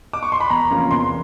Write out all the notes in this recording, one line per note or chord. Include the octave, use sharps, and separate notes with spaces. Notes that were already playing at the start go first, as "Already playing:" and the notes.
D6
C#6
C6
B5
E2 A#5
C3 F3 A#3 C#4
E2 C6